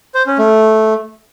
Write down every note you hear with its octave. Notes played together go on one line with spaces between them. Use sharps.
C5
C#4
A3